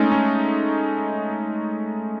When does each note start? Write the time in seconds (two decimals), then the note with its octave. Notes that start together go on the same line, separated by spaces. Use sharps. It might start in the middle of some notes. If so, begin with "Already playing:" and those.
Already playing: G#3 A3 C#4 D#4
0.12 C#4